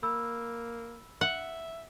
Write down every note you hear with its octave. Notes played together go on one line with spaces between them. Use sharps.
A#3 B5 E6
E5 F#5